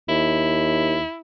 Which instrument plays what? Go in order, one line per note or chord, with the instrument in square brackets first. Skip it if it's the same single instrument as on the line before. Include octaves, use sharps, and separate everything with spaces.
[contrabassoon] D#2 [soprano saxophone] E4